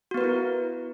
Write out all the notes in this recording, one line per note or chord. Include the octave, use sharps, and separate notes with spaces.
B3 E4 F#4 A#4 B4